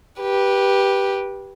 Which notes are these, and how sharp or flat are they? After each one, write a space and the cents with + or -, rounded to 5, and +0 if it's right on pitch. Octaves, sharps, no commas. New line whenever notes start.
G4 +0 B4 -20